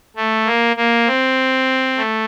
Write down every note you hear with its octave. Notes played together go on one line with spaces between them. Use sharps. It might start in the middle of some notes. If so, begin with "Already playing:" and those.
A3
A#3
A#3
C4
A3